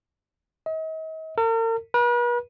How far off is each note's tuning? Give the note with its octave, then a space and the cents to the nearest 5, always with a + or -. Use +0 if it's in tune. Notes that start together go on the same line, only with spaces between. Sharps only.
D#5 +40
A#4 -45
B4 -40